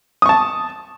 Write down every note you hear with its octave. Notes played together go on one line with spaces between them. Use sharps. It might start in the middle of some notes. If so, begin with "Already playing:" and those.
A5 C#6 D#6